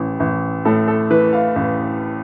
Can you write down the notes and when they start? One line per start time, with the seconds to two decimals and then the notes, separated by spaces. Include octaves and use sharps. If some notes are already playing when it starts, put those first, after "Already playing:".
Already playing: A1 A2
0.20 A1
0.65 A2 A4
0.87 A4
1.10 E3 B4
1.33 F5
1.56 A1